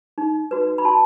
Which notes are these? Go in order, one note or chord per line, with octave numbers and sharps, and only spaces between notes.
D#4
F#4 B4
B5
F#4 A5 C6